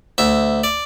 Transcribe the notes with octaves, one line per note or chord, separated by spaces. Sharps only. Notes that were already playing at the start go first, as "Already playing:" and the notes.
D2 E5
D5